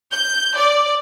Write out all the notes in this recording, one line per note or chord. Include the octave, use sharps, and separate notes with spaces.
G6
D5